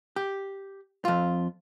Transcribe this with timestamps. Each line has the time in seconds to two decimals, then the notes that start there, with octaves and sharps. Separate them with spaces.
0.16 G4
1.05 F2 F4